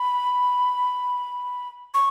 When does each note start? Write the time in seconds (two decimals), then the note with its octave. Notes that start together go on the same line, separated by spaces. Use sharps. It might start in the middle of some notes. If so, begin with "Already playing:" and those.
Already playing: B5
1.94 C#6